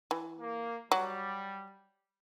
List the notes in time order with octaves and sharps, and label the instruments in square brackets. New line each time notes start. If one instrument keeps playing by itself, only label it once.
[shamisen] E3
[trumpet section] A#3
[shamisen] F#3 [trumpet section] G3